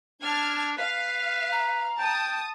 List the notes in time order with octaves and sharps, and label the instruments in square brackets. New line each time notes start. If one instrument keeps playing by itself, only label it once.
[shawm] D4 [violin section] A5 F6 G#6
[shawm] B4 [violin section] F5
[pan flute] A#5
[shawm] G5 [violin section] A5 D#6